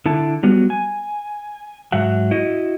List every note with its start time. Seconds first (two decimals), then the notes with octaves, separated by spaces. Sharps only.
0.06 D3 E4 A5
0.43 F#3 G3 B3 F#4
0.70 G#5
1.92 G#2 F#3 E5 F#5
2.31 E4 F#4 D#5